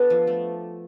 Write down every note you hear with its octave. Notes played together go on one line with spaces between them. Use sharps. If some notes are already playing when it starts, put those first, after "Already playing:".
Already playing: B3 D4 A4 B4
F3
A3